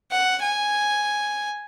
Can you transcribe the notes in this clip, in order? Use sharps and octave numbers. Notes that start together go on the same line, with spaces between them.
F#5
G#5